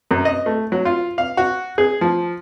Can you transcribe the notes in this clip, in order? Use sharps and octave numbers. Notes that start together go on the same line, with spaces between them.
F#2
D#5
A3
F#3
F4
F5
F#4
G#4
F3